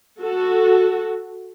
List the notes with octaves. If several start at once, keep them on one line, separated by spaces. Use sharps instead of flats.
F#4 A4